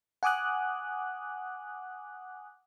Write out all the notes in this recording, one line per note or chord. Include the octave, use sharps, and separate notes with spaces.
F#5 G#5 D6 D#6 F#6